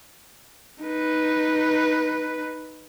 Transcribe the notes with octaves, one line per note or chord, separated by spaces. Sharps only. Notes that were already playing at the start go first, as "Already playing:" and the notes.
D#4 B4